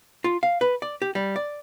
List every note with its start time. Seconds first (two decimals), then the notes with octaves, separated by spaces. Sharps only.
0.24 F4
0.43 F5
0.61 B4
0.82 D5
1.02 G4
1.15 G3
1.36 D5